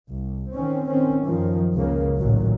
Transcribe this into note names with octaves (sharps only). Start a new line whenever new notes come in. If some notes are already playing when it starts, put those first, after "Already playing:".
C2
D#3 C4 C#4
D#3 C4 C#4
F#2 D#3 F3
C#2 C#3 A#3
A1 A#2 D#3 F#3